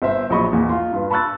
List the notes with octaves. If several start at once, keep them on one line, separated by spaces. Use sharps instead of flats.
G1 C5 E5
A#1 F#3 D#5 B5 C#6
E2 A#2
F4 C6
G2 B4
A5 B5 C#6 E6 F#6 A6